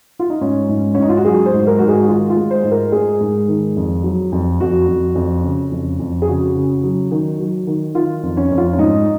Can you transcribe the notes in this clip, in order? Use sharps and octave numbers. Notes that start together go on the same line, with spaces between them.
F4
D#4
G#2 C#4
G#2
G#2 C#4
D#4
F4
F#4
F#3 G#4
C5
G#2
A#4
G#2 F#4
G#4
F#4
D#3 F4
F4
G#3
C5
G#2
A#4
G#3 G#4
G#2
D#3
F2
F#3
F2
F2 F#4
F2
F2
C#3
F2
F2
G#4
C#3 F#4
C#3
F#3
D#3
F#3
D#3
D#3 F4
F2
C#4
F2
F4
C#4
G#2 D#4